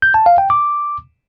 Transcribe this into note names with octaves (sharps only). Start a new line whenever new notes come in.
G6
A5
F5
G5
D6